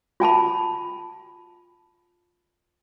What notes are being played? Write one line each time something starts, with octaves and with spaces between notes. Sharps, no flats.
F4 G#5 A5 B5